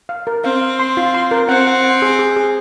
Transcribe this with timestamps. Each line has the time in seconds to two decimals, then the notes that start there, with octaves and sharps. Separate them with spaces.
0.09 F5
0.27 A#4
0.44 C4 F5
0.61 F5
0.79 C6
0.97 F4
1.14 C6
1.31 A#4
1.49 C4 F#5
1.67 F#5
1.84 F#5
2.02 G#4
2.19 G#4
2.36 G#4